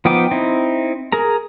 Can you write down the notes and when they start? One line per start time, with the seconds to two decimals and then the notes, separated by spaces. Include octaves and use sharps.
0.05 F3 B3 D#4 G5 D6
0.31 C4 D#4 E4
1.12 G#4 A#4 A#5